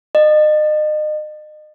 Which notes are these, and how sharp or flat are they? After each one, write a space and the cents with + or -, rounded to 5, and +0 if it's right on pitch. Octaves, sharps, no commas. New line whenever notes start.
D#5 -35